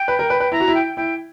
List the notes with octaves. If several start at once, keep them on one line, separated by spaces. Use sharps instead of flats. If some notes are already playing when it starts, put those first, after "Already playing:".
Already playing: G5
B4
A#4
B4
B4
E4 A#5
F#4
E4
G5
E4 G5